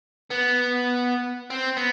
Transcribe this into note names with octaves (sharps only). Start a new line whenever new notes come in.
B3
C4
B3